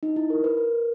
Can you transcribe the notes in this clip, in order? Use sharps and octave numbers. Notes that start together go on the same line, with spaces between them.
D#4
E4
A#4
B4
A#4